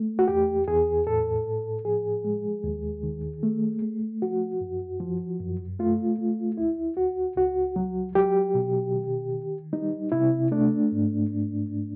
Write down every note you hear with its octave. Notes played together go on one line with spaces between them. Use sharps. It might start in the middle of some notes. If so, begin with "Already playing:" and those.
Already playing: A3
F#4
E2 G4
E2 G#4
A2 A4
A2
F3 G#4
G#3
D#2
D#3
A3
A3
F3 F#4
F#2
F3
F#2
A3 F4
A3
D2 E4
D2 F#4
C#2 F#4
F#3
F#3 G4
B2
D#3
D#3
G3 D#4
C3 E4
A3 D4
G#2
A3
G#2